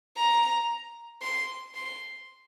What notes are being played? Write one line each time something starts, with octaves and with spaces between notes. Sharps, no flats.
A#5
C6
C6